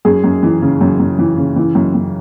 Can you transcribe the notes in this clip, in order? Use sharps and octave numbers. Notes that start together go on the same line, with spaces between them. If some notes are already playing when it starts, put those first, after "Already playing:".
F#2 G#4
F#2
E3
C#3
F#2
F#2
E3
C#3
E3
F#2
F#2